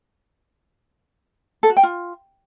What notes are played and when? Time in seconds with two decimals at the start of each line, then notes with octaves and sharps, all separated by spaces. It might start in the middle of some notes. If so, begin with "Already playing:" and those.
1.63 A4
1.70 F#4
1.77 G5
1.83 F4